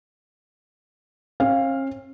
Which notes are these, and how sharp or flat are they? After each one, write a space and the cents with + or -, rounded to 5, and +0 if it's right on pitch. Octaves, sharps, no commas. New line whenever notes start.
C#4 -45 F5 +0